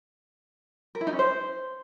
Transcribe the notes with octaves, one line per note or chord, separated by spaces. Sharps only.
A#4
E4
D#4
C#4
C5